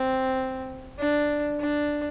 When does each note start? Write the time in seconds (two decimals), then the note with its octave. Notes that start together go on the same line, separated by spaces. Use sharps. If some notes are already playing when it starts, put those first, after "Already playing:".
Already playing: C4
0.99 D4
1.60 D4